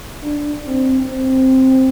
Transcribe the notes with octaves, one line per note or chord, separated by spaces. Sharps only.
D4
C4
C4